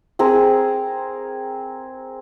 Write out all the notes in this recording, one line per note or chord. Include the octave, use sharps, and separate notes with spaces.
C4 G#4 A#4